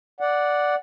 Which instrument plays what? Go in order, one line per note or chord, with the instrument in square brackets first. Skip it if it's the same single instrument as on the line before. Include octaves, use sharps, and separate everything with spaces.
[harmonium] D5 F#5